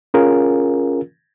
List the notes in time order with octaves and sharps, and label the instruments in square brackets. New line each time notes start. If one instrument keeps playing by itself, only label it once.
[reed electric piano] C#4 F4 G#4 A#4